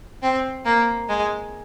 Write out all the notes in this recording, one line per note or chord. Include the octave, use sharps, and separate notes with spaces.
C4
A#3
G#3